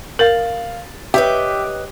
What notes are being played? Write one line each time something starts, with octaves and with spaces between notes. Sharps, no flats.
A#4 F5 A6 F#7
G4 B4 C#5 D#5 E5